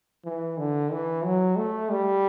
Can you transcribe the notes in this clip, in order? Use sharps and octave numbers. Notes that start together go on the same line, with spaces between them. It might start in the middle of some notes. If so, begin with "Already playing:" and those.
E3
D3
E3
F#3
A3
G3